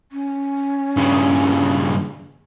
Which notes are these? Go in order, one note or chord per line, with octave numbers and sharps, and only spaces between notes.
C#4
G2 C#3